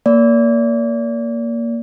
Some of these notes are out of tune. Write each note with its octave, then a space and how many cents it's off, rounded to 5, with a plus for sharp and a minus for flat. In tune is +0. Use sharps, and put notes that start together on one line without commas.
A#3 +0 D5 -35